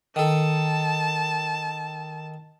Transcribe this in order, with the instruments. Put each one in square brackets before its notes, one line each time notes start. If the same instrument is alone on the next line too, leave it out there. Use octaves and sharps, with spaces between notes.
[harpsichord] D#3 A4 [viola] A5